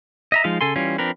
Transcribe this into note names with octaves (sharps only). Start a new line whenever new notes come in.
D#5 E5 A#5
F3 G#3 D#4 F5
C#3 A4 G#5 C6
E3 G3 C#4 F4
F3 C4 D4 A#4 B4